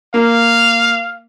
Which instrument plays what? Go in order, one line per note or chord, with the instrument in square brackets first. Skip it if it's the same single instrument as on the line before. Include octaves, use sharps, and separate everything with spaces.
[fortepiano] A#3 [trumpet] F5